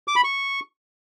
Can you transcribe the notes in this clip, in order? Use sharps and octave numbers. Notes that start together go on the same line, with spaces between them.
D6
B5
C#6